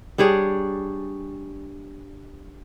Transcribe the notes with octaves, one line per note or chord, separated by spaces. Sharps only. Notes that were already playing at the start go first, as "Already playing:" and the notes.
G3 D4 G#4 C#5